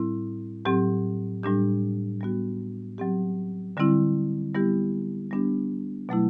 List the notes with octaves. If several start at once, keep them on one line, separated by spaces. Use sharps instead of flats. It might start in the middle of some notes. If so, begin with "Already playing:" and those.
Already playing: A2 G3 C4 E4
A2 F#3 C4 G4
A2 G3 D4 G4
G3 B3 F#4
F#3 C4 G4
D3 G3 C4 E4
G3 B3 E4 G4
G3 B3 D4 G4
B2 F#3 A3 E4